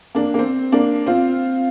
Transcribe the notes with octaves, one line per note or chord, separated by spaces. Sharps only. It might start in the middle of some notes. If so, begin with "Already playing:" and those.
A#3 D4
A#3
C4
A#3 D4
C4 F4